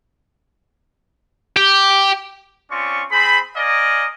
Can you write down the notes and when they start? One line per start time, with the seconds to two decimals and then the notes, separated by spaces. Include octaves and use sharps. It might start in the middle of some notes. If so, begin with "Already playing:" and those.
1.56 G4
2.71 C4 C#4 F4 D5 C#6
3.12 C4 G#4 C5 B5
3.57 A#4 D5 D#5 F5 G#5